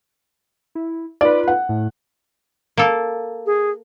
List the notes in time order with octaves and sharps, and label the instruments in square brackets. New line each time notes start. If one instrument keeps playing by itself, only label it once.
[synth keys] E4
[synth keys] D#4 F4 B4 [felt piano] D5
[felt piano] F#5
[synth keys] A2
[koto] A#3 A4
[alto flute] G#4